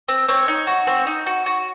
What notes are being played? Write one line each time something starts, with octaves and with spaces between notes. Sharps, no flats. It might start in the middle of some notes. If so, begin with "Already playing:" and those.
C4
C4 C#5
D#4
F#4
C4
D#4
F#4
F#4